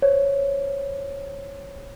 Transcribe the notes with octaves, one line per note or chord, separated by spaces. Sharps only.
C5 C#5